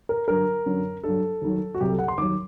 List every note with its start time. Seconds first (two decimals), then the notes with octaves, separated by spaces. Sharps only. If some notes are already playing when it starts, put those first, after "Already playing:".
0.09 A#4
0.28 G2 D3 F#3 A#4
0.66 F#2 D3 F#3
1.03 G2 F#3 A4
1.41 D#2 D#3 F#3
1.75 F#4
1.80 C2 C3 F#3 G4
1.89 A4
1.99 F#5
2.08 C6
2.18 D#2 D#3 F#3 D6